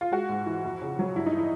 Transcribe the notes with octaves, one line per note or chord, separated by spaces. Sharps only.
F4
G#3 F#4
G#2
E3
F2
C#3
F#3
G2 E4
D#4
E3
E4